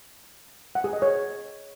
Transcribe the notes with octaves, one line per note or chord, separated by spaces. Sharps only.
F#5
G#4
D#5
C#5